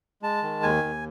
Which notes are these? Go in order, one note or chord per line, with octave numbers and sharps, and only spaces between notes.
G#3 A5
D#3
D#2 G#5
D#2